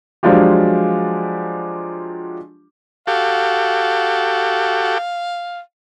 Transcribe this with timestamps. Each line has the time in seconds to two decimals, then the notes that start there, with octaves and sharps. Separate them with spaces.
0.23 F3 F#3 G#3 D4 F4 G4
3.07 F#4 G4 A4 F5